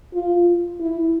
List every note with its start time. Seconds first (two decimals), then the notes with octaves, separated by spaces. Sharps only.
0.14 F4
0.80 E4